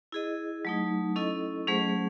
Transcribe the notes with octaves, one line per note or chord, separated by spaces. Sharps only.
E4 G#4 D#5
F#3 A3 D#4
C#4 E4 A4 D#5
F#3 A3 C#4 G#4 C5